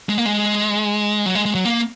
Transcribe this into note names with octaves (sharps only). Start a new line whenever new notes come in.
G#3
A#3
G#3
F#3
G#3
G#3
F#3
A#3